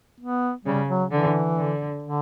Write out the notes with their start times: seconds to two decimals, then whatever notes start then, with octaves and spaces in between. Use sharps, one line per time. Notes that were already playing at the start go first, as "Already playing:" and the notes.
0.20 B3
0.65 C#3 G3
0.88 F#3
1.11 D3 E3
1.57 D3
2.02 D3